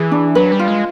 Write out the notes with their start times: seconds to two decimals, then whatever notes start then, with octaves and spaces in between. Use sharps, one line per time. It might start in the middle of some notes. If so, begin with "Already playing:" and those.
Already playing: E3 G#4
0.12 D4
0.35 F#3 B4
0.52 G3
0.59 F4
0.68 G#3